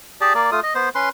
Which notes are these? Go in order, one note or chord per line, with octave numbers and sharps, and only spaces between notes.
G4 G#4 D5 A5
A#3 D5
A3 F4 D#6
D#5
B3 C5
C#4 B4 C6